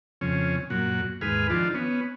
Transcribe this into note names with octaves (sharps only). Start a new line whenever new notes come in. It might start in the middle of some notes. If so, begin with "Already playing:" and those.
F2 C#3 C#4
F#2 A#2 F#4
D#2 G#2 G#4 B4 F6
D#3 F3 D4 F4
B3 C#4